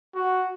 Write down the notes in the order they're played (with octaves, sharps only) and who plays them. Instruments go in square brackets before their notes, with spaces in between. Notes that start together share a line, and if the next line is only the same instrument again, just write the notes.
[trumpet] F#4